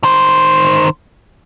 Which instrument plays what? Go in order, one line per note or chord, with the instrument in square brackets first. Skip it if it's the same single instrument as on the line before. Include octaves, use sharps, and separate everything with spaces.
[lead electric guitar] D#3 C5